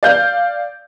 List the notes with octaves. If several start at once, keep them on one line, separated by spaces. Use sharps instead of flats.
D5 F5 G6